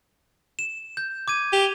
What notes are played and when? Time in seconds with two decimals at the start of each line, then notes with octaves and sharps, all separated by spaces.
0.59 E7
0.97 G6
1.28 D6 G#6 D#7
1.53 G4 F7